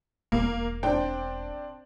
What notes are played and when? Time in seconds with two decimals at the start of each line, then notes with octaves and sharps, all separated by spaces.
0.32 E1 A#3
0.83 C4 D4 G5